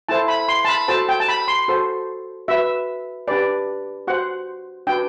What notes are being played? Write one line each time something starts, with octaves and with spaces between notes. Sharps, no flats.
E4 A4 C5 A5
B5
C6
A5
B5
F#4 A4 C5 A5
G5
A5
B5
C6
F#4 A4 C5
F#4 B4 E5
D4 G4 B4 D5
F#4 C5 F#5
D4 F#4 B4 G5